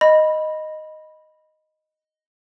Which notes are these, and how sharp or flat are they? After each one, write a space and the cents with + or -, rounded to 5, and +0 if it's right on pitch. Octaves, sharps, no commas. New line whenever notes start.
D#5 +0 B5 -10